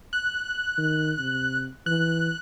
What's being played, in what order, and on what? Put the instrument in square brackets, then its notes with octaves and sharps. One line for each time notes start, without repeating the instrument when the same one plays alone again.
[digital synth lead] F#6
[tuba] D#3
C3
[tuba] E3 [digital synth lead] F#6